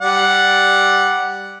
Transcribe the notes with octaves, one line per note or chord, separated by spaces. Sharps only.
G3 D5 F#5